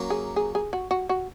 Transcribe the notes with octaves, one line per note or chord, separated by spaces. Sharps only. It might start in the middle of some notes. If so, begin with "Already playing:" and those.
Already playing: F#3 A#3 C#4
G#4
G#4
G#4
F#4
F#4
F#4